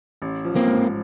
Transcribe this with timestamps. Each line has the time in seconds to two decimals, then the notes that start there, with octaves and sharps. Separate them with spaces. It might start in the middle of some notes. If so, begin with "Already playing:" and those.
0.22 A1
0.44 F3
0.56 A#3 C4
0.67 G#2